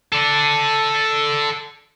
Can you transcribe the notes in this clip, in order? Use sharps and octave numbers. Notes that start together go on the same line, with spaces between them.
A4 D5